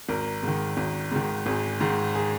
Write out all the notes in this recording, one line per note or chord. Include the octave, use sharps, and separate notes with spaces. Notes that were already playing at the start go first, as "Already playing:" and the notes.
G#1 A#4
G#2 D#3
G#1
G#2 D#3
G#1 G#4
G#2 D#3
G#4